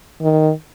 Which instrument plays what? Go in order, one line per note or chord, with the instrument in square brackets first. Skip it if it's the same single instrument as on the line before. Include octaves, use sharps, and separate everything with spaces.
[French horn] D#3